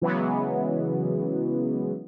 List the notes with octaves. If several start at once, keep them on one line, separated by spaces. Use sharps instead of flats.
C#3 E3 F#3 G#3 B3